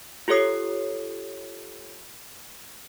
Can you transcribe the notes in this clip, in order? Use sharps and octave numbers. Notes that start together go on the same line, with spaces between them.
F4 G4 A4 C#5 D#6 C7